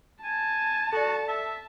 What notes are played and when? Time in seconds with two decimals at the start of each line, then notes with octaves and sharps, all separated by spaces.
0.24 G#5 A5
0.93 F#4 A4 D5
1.28 E5